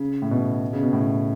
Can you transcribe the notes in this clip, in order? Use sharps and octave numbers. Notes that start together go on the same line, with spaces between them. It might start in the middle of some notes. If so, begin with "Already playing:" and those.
Already playing: C#3
A2
B2
C#3
B2
A2